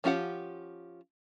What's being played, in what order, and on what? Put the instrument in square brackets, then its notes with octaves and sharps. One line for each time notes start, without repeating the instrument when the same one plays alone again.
[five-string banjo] F3 C#4 F4 G4 F#5